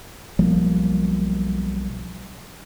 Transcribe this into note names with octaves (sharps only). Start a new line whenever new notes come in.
B1 F3 G3 A#3